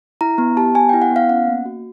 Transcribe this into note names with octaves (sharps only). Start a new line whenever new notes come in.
E4 A#5
B3
G4 A5
B3 G#5
G5
E4
F#5
B3
F5
C#4 F#5
A#3
F#4